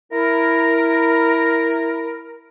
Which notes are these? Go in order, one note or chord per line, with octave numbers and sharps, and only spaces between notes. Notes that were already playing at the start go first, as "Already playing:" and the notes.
E4 A#4